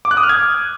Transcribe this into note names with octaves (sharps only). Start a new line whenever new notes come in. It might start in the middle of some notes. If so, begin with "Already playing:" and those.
D6
F#6
D#6
F6
G#6